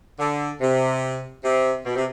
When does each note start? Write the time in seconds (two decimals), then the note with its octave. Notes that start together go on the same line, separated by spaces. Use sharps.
0.19 D3
0.61 C3
1.44 C3
1.86 B2
1.95 C3